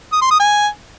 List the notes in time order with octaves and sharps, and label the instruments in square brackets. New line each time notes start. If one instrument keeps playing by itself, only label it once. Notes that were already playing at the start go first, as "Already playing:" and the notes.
[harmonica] D#6
C6
D#6
G#5